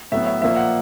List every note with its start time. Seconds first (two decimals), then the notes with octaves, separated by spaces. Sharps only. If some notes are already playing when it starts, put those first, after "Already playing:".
0.12 A2 F#3 B3 E5
0.27 E5
0.41 A#2 F3 A#3 E5
0.56 F#5